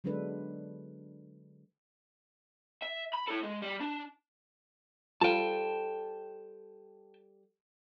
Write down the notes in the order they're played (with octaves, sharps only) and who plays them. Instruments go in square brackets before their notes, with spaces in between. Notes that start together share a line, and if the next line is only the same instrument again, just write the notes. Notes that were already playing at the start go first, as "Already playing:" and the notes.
[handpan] D3 F#3 G#3 D4 A4 B4
[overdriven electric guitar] E5
B5
E4 A4
G#3
G3
D4
[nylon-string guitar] G3 A4 C5 [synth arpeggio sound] F4 F5 [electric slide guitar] G5 A5